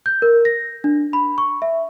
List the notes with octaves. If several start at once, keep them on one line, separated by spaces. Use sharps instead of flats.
G6
A#4
A#6
D4
B5
C#6
E5